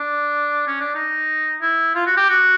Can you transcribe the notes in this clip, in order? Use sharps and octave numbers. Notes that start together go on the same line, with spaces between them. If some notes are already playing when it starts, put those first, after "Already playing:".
Already playing: D4
C#4
D4
D#4
E4
F4
F#4
G4
F#4